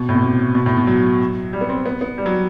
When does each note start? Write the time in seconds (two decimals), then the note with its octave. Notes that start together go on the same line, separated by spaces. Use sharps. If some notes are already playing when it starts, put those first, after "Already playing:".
Already playing: B2
0.09 A2
0.15 B2
0.22 C3
0.55 B2
0.66 A2
0.77 B2
0.87 F#3
1.53 G3
1.61 B3
1.69 C4
1.86 B3
2.01 B3
2.18 G3
2.26 F#3